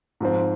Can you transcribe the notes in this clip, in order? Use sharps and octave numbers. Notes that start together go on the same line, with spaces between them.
G#2 F3 C4